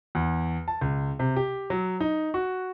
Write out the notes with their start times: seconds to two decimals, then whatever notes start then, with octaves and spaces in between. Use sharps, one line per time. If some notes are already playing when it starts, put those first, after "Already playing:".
0.15 E2
0.68 A5
0.81 C#2
1.19 C3
1.36 G4
1.70 F#3
2.00 D#4
2.34 F#4